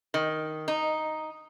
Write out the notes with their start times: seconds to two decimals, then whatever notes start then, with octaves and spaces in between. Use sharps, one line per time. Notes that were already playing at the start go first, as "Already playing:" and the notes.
0.14 D#3
0.68 D#4